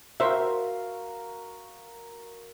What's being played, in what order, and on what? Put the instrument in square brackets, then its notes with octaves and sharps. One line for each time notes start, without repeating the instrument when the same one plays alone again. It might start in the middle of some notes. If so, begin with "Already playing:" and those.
[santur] F#4 A#4 F5 [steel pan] C5 E5